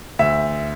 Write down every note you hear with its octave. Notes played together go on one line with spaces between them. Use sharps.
D2 E5